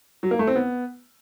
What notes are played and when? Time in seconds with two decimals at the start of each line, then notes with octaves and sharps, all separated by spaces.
0.23 F#3
0.31 A#3
0.39 A3
0.47 C4
0.56 B3